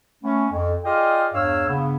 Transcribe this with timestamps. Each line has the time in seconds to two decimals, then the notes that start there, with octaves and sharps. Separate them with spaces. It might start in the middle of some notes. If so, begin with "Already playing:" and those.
0.23 A3 B3 C#4
0.51 F2
0.85 F4 G#4 D5 D#5 F5 G5
1.34 E2 G2 C#5 F5 E6
1.68 G2 C#3 B3